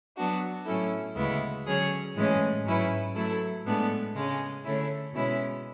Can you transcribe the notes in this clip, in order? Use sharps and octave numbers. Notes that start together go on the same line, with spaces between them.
F#3 B3 D4 F#4
A2 F#3 C#4 E4 A4
D2 C#3 G#3 B3 E4
D3 F#3 C#4 G#4 C#5
A2 E3 G#3 C#4 G#4
G#2 F#3 C#4 E4 B4
F#3 A3 E4 A4
A2 G#3 B3 D4 A4
C#3 G#3 C#4
D3 A3 C#4 E4
B2 G#3 C#4 E4